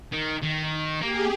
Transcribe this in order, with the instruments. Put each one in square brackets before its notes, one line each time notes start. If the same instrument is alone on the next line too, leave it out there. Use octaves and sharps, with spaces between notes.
[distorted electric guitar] D#3
D#3
[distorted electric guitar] A#3 [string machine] G4 G#4